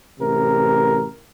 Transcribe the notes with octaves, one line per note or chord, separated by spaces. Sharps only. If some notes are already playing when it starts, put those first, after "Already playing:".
A1 C3 A#4